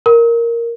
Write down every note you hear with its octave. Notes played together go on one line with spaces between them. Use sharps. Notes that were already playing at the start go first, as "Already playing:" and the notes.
A#4